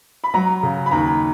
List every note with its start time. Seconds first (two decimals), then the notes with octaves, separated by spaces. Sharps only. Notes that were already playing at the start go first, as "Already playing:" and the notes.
0.24 B5
0.34 F#3 A#5
0.63 C#3
0.86 B5
0.91 D#2 A#5